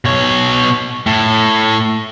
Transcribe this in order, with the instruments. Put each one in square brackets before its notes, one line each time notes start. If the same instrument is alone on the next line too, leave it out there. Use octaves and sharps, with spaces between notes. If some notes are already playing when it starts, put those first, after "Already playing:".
[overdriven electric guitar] B2 C#5
A2